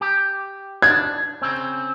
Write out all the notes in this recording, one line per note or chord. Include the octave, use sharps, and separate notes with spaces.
G4
D4 G#6
C#3 C4